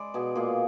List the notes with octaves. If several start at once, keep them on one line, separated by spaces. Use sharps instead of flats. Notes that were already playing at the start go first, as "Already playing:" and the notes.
Already playing: G#3 B4 D5
B2 G#4
A#2 G#4